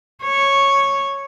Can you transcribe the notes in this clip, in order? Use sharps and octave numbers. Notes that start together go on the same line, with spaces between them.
C#5